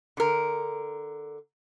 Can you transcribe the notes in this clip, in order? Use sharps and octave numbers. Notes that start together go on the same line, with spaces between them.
D3 A#4